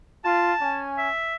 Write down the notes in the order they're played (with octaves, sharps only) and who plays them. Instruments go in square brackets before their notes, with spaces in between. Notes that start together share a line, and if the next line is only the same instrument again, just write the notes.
[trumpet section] F4 [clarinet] A5
[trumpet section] C#4 G#5
[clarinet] E5